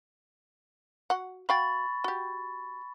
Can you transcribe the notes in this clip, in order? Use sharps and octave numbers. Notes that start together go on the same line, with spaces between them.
F#4 F#5
F#4 F5 G5 B5 C#6 A6
F#4 G4